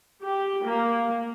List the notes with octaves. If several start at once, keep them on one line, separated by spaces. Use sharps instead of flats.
G4
A#3